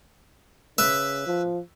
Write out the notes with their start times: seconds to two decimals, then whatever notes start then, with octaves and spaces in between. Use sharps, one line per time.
0.78 C#3 B4 E5
1.26 F3